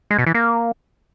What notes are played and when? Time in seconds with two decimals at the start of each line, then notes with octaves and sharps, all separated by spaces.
0.11 G#3
0.19 B2
0.27 E3
0.35 A#3